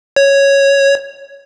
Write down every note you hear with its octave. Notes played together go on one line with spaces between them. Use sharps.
C#5